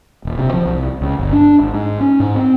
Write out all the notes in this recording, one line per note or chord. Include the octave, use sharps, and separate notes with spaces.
D#1
C3
F3
C2
C#2
G1
D4
G#1
G#2
C#4
G#2
C4